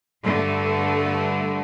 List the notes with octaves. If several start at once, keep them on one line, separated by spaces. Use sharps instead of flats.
G2 D3 A3